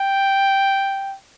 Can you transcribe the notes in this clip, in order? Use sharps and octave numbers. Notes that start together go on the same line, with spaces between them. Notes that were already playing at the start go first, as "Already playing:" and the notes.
Already playing: G5